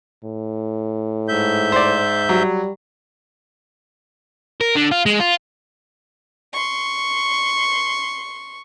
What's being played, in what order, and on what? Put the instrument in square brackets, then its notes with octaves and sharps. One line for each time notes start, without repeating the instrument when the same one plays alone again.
[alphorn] A2
[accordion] G#2 E5 G6
[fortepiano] C5 D5
[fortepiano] F#3 [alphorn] G3
[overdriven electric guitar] A#4
D3
F4
G#3
F4
[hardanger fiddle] C6 C#6